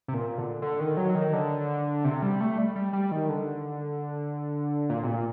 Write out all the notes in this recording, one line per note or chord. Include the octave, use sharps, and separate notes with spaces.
C3
A#2
D3
D3
D#3
F#3
D#3
D3
C3
G3
A3
G3
G3
G3
D#3
D3
A#2
C3
A#2